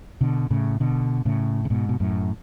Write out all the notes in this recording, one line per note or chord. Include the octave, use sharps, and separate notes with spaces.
B2 D3
A2 C#3
B2 D3
A2 C#3
C#3
G#2 B2
B2
F#2 A2